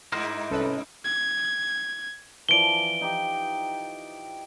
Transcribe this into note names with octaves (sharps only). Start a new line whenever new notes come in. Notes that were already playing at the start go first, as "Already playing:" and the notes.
G2 D#4 E4 A#4 C5
C2 C#4 A4 B4
G#6
E3 F3 D5 D7 G7
D#4 G4